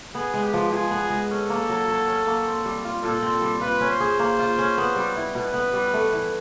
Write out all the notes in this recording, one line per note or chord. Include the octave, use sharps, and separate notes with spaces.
B3 G#4
G#3
G4
F3
F3 G#4
B3
G#3
C#4 A4
A#3
F#3
F#3
C#4
A#3
C4
G3
F4
A#2 A4
C4
G3
F4 B4
C#4
C5
G#4
A#3 C5
F4
C#4
B3
G3
E4
B2 B4
B3
G3
A3
E3